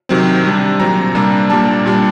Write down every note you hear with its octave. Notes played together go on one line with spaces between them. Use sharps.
C3 D#3 F#3 C4
C3 G3 D4
A#2 F#3 C4 A#5
C3 G3 A#3 D4
A#2 G3 A#3 D4 A5
A#2 G3 D4